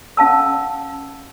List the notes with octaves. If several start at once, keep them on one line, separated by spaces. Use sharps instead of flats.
C#4 F5 A5 E6